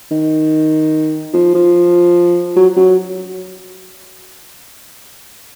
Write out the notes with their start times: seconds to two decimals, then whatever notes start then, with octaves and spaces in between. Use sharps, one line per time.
0.11 D#3
1.34 F3
1.54 F3
2.56 F#3
2.77 F#3